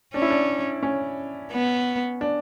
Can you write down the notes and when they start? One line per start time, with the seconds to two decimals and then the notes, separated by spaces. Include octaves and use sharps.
0.14 C#4 D4
0.22 E4
0.31 D4
0.83 C#4
1.52 B3
2.21 D4